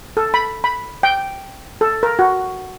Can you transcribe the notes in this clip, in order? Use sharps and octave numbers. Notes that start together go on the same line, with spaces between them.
A4
B5
B5
G5
A4
A#4
F#4